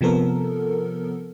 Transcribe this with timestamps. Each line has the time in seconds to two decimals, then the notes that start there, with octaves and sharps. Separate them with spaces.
0.01 C3 F3 B3 A4 A#4